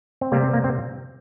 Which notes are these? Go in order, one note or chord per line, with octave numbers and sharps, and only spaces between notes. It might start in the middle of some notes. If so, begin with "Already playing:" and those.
C4
C3 G3 A#3
C4
A#3
C4